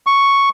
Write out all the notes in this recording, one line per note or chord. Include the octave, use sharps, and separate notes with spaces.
C#6